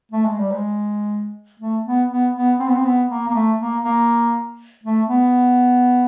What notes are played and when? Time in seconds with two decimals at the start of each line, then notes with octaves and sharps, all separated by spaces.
0.11 A3
0.25 G#3
0.38 G3
0.52 G#3
1.60 A3
1.85 B3
2.10 B3
2.35 B3
2.59 C4
2.67 B3
2.75 C4
2.85 B3
3.09 A#3
3.28 A#3
3.34 A3
3.59 A#3
3.84 A#3
4.84 A3
5.08 B3